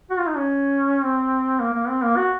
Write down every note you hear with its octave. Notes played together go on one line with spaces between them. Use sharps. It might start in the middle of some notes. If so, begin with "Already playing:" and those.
F#4
F4
D#4
C#4
C4
A#3
A#3
C4
A#3
F#4